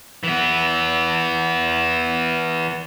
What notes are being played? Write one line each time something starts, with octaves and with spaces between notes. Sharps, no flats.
E3 B3